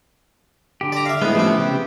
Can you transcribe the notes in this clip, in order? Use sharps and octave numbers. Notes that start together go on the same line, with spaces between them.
D3 G4
D5 A#5
E5 F5
A2 G#3 B3
C3 F3 A3 B3 C#4
C#3 G4